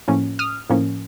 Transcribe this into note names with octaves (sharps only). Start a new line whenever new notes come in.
A2 F3 A#3 C#4
D#6 F6
A2 F3 A#3 C#4